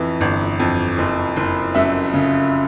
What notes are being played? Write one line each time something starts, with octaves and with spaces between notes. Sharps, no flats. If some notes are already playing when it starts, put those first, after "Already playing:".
Already playing: F2 E3
G1
F2
F#1
F#1
F#2 E5
C#3